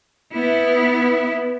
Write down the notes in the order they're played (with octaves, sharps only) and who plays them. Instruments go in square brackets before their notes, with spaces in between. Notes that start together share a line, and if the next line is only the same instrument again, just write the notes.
[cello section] B3 E4